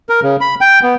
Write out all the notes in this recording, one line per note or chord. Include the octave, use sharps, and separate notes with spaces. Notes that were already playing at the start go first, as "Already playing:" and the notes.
A#4
C#3
B5
G5
B3